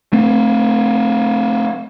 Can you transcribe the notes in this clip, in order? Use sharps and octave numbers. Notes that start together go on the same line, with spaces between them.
A3 C4